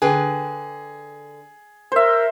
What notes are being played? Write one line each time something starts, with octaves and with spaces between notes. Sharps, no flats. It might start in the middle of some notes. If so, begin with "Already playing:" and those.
D3 G#4 B4 G5
A#4 C5 E5